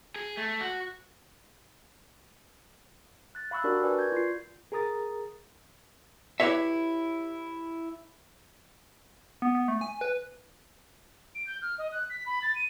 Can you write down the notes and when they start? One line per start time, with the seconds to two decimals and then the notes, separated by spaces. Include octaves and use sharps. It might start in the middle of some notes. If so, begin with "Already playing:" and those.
0.16 G#4
0.37 A3
0.61 F#4
3.35 F#6 A6
3.51 F5 B5 C#6 E6 F#6
3.64 D4 F#4 G4 A#4 D5
3.83 A#4 B4 D5 G#5 C#6
3.99 G6 G#6
4.12 F4 C7
4.72 G#4 A#4 A#5 D#6 A6
6.40 E4 G4 B4 C#5 E5
9.42 B3
9.55 B3
9.68 A3
9.81 G#5
10.01 B4
11.35 D7
11.47 G6
11.62 F6
11.78 D#5
11.92 F#6
12.10 B6
12.26 B5
12.42 A6
12.55 D#7